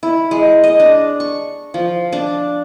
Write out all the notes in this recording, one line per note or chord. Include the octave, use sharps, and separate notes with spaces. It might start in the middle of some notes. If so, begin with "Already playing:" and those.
E4
G#3
D#5
D4
C#6
F3
D4